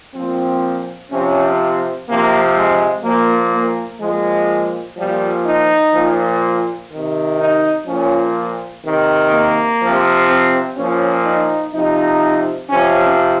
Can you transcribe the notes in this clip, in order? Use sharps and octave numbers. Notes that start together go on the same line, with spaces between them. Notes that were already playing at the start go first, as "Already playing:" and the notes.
A#2 F3 C4
C3 F3 C#4
C3 F3 A#3
G#3
A#2 F3 A#3
A#3
A#2 F3 G#3
A#2 F3 G3
D#4
A#2 F3
C3 D#3
D#4
A#2 F3 C#4
C3 D#3
A#3
C3 F3
C4
A#2 F3 C#4
D#4
C3 F3 D#4
C3 F3 C#4